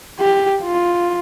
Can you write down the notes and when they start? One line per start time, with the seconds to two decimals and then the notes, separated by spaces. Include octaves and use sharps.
0.20 G4
0.62 F4